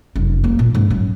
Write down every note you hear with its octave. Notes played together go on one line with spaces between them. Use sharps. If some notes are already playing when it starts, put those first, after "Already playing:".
F1 F#2
A#3
A#2
G#2 C#3
F#2